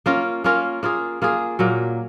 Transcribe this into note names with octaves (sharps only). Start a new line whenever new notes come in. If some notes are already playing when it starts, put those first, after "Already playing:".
A#3 C#4 F4 A#4
A#3 C#4 F4 A#4
A#3 F4 G#4
A#3 F4 G#4
A#2 F#3 A#3